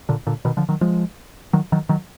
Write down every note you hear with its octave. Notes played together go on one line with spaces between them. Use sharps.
A#2 D3
A#2 D3
B2 D#3
D3 F3
D#3 F#3
F3 G#3
D#3 F#3
D#3 F#3
D#3 F#3